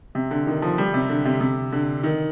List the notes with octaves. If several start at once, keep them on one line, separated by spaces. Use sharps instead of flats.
C3
D3
D#3
F3
G3
C3
D3
C3
C3
D3
D#3